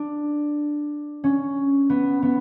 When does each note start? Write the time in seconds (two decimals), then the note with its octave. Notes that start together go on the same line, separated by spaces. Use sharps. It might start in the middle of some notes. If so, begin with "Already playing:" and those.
Already playing: D4
1.24 C#4
1.90 B3
2.22 B3